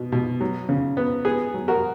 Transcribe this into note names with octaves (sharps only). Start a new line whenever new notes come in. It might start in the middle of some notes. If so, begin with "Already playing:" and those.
Already playing: B2
B2
F#3
C#3
B3
B3 G#4
F#3
F#4 A#4